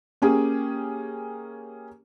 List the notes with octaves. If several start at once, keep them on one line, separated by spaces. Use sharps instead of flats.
A#3 C#4 G4 G#4